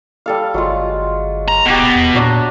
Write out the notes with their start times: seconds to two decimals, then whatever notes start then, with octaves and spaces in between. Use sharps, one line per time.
0.26 G3 A4 F5
0.54 G1 F#3 G#3 F4
1.48 A#5
1.66 D1 B2 G4 F#5
1.95 E2
2.15 A#2 F#3 D4